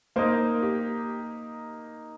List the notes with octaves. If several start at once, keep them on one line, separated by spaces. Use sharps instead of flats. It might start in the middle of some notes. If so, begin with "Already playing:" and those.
A#3 D#4 A#4 C5
G4